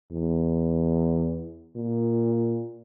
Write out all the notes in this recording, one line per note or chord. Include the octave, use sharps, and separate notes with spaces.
E2
A#2